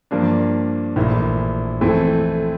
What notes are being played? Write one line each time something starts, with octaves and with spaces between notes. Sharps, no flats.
G2 F3 A#3 D4
A#1 A2 E3 A#3 E4
F2 E3 A3 C4